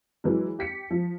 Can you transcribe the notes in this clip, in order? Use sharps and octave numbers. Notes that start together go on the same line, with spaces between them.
E3 F#3 G#3
G4 B6 C#7
F3